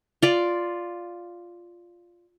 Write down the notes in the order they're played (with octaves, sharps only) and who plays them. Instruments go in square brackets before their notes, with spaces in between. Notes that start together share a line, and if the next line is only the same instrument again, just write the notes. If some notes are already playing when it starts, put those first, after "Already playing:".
[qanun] F4 D5